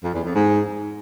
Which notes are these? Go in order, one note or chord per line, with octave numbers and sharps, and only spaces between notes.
F2
E2
F2
G#2